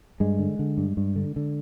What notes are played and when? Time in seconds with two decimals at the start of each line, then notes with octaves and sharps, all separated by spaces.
0.20 G2 G#3
0.39 D3
0.59 D3
0.78 G2
0.97 G2
1.16 D3
1.36 D3